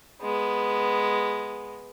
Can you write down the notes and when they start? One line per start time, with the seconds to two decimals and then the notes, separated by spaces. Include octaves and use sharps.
0.22 G#3 B3